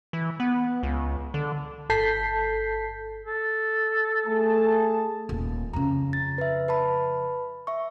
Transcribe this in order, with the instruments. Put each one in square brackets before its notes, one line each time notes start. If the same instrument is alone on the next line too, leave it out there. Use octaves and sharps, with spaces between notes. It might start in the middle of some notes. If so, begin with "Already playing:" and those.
[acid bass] E3
B3
C#2
D3
[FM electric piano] G1 A4 A5 G6 B6 C7
[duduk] A4
[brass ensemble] A3 G#4 A5
[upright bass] D#1
[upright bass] F2 C#3 [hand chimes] A#5
[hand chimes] A6
B4 E5
B4 A5 B5
E5 C#6